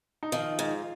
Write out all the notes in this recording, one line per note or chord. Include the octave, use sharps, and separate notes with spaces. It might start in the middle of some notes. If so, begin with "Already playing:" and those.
D#4
D#3 F3 F4
G#2